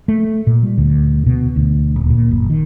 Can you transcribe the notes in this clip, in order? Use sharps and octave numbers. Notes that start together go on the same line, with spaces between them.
A3
A#2
G3
D2
B2
D2
D#1
A#2
F#1
D#3